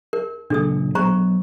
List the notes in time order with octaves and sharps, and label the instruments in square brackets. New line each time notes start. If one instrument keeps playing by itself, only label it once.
[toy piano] A#4
[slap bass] A#2 C#3 F#3 [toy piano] D4 A4 D#6
[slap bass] F#3 B3 [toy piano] C5 A#5 C#6